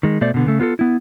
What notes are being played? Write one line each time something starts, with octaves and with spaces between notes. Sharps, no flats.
D#3 G#3
B2 A3 C5 D5
B2 D3 B3
C#3 A3
B3 F4 G#4 A4
B3 E4